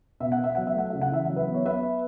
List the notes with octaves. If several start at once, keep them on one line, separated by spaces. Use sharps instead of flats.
B2 E5
F#5
B3
E5
F#3 F#5
E5
A3 F#5
C#3 E5
F#5
E3 E5
F#3 F#5
B4 E5
B3
C#5
B3 B4 E5